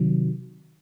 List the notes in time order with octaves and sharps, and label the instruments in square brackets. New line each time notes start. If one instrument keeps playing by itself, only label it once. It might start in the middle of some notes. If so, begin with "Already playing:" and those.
Already playing: [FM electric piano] C3 D#3 F#3